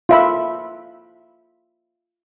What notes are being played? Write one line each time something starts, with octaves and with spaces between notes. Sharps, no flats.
F4 E5 B5